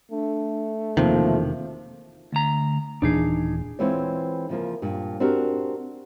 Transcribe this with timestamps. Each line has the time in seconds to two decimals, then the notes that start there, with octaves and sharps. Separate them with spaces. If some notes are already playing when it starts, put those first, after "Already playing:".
0.11 A3 D4
0.97 E1 C3 D#3 F3 A#3
2.32 D2 A#5
3.02 D#1 A#2 E3 D4 D#4 G#4
3.79 E3 G#3 B3 C4 F4 C#5
4.49 C#3 F3 A#3
4.82 G2 A#2
5.20 C4 D4 F#4 G4 A#4